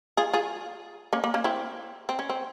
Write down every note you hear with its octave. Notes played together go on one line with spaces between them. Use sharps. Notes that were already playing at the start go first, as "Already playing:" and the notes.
F4 G#4
F4 G#4
A#3 C#4
A#3
A#3 C#4
C4 E4
C4
C#4
C4